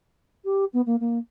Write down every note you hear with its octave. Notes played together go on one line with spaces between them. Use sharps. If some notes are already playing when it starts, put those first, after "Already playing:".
G4
B3
A#3
A#3